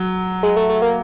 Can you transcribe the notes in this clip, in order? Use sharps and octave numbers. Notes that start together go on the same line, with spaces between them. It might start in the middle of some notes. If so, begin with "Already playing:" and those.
Already playing: F#3
G#3
A3
A3
A#3